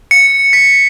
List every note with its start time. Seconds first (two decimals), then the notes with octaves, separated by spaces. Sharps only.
0.11 C#7
0.53 B6